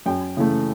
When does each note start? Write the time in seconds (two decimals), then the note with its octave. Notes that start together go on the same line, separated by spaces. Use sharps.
0.06 F#2 G5
0.37 C#3 E3 A3